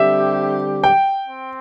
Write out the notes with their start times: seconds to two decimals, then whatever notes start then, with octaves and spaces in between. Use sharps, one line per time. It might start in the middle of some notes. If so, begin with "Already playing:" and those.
Already playing: D3 G3 C4 G4 E5
0.84 G5
1.28 C4